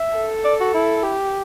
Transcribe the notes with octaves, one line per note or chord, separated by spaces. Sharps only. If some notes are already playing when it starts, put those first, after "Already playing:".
Already playing: E5
A4
D5
F#4
E4
G4